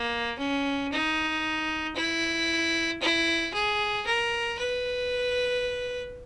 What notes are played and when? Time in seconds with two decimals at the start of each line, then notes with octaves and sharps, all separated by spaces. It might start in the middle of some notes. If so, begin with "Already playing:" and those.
Already playing: A#3
0.39 C#4
0.92 D#4
1.96 E4
3.02 E4
3.54 G#4
4.06 A#4
4.59 B4